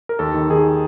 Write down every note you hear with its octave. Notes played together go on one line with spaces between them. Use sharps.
A#4
D#2 A4
D#3
D#3 G#4